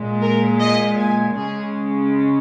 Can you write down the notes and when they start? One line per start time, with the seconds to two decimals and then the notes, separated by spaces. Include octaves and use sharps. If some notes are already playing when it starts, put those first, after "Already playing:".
Already playing: A#2 G#3
0.22 A#4
0.60 D#5
0.98 G#5
1.36 C#3 G#3 G#4